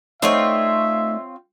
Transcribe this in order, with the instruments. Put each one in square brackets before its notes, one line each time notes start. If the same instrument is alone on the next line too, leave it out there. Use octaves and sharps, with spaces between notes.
[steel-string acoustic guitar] A3 D#4 D5 [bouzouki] C4 F4 C#5 [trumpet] E5